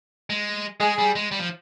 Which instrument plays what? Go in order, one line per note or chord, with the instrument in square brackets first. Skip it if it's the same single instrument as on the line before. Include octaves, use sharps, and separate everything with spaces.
[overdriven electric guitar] G#3
[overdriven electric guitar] G#3 [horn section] G#4
[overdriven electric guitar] G3
G#3
G3
F3